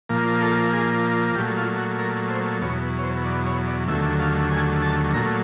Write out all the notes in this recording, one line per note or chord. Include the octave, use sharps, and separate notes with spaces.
A#2 F3 A#3
A4
G#4
A#2 F#3 A3 G4
F4
F#4
A#4
C5
E2 B2 F#3 C#5
C#5
C5
D5
C#5
D5
D#2 D3 F#3 A3 E5
F5
G#5
A5
A#2 F#3 A3 A#5